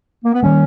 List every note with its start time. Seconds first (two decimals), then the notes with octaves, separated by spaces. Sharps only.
0.24 A#3
0.33 B3
0.42 D#3 G3 A#3 C#4